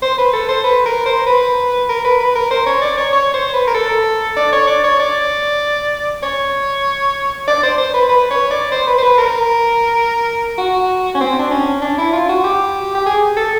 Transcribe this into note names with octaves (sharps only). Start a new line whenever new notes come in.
C5
B4
A4
C5
B4
A#4
C5
B4
A#4
B4
B4
A#4
C5
C#5
D5
C#5
C#5
C5
B4
A#4
A4
D5
C#5
D5
C#5
D5
C#5
D5
C5
C5
B4
B4
C#5
D5
C5
B4
C5
B4
A#4
F#4
C#4
C4
D4
C#4
D4
E4
F4
F#4
G4
G4
G#4
A4